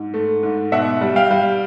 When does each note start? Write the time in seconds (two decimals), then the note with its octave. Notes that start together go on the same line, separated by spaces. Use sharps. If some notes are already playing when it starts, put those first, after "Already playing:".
Already playing: G#2
0.14 A3
0.43 G#2
0.72 B2 E5 F#5
1.01 G3
1.16 F5 G5
1.31 G3